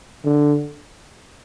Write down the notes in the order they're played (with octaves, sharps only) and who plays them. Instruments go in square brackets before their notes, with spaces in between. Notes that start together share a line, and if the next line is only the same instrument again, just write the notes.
[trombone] D3